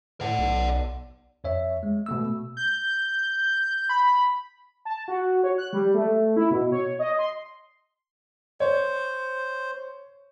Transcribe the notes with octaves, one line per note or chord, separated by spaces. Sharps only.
A2 D5 F#5
B1
F2 C#5 E5
G#3
B2 A3 E6
G6
B5
A5
F#4
C#5
F#6
G3
A3
E4
B2
C#5
D#5
C6
C5 C#5